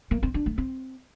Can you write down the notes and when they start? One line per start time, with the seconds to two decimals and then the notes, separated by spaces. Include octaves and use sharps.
0.11 A#3
0.23 C4
0.34 D4
0.46 A3
0.58 C4